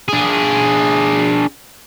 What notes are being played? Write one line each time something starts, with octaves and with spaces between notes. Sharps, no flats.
D4 G#4